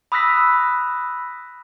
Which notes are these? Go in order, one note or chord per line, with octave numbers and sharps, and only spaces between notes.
B5 D#6 E6 F#6 A#6 B6